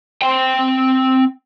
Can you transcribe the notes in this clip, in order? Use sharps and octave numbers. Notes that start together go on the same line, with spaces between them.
C4 G5